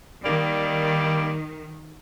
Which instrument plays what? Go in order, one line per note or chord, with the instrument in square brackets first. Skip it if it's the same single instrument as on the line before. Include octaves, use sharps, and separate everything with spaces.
[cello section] D#3 [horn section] G3 A#3 D5